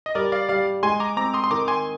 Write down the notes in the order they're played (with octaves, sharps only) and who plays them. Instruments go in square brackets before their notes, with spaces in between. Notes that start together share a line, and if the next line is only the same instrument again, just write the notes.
[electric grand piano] D#5
[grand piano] G3 [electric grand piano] A#4 D5
[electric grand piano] D5 F5
[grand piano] G3 [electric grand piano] D5 F5
[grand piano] G#3 [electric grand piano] G#5 C6
[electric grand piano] A#5 D6
[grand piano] C4 [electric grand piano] A#5 D6
[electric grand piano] C6 D#6
C6
[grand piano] D#3 [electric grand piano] A#5 D6
[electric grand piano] G#5 C6